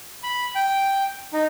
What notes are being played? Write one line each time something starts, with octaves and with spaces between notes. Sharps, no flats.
B5
G5
D#4